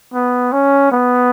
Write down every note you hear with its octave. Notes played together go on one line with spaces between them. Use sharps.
B3
C#4
B3